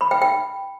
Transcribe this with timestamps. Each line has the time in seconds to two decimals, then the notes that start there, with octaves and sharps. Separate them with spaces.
0.01 B5
0.11 G5
0.22 G5